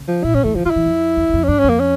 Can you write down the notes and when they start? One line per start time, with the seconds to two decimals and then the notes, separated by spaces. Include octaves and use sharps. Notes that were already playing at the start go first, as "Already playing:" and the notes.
Already playing: C#3
0.08 F3
0.24 A#2 E4
0.34 G2 C#4
0.44 E2 A3
0.55 D3 F3
0.66 D3 E4 F4
0.76 E3
0.86 F2
1.17 E2
1.29 E2
1.33 F2
1.44 C#4
1.48 G2 D4
1.59 F2 C#4
1.69 A#3
1.80 C#4